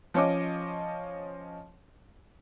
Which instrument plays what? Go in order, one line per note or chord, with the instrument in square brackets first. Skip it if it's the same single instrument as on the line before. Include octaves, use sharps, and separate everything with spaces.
[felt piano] F3 C#4 C#5 D#5 D6